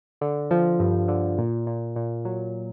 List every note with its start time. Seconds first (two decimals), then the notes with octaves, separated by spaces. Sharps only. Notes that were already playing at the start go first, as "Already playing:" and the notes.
0.21 D3
0.51 F3
0.80 G2
1.08 D3
1.38 A#2
1.67 A#2
1.96 A#2
2.25 F#3